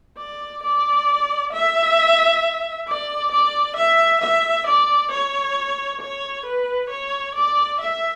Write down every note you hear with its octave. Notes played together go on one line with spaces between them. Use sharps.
D5
D5
E5
D5
D5
E5
E5
D5
C#5
C#5
B4
C#5
D5
E5